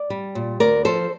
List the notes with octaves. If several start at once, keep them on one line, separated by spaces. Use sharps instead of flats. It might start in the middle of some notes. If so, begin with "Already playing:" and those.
Already playing: D5
G3
A#2
D2 A#4 D5
F3 A4 C5